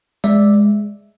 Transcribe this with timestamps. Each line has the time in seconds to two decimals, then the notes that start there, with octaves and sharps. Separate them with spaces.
0.24 G#3 D5 E5